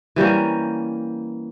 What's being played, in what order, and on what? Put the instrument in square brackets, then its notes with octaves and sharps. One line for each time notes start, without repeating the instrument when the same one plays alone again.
[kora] E3 G3 A#3 C#4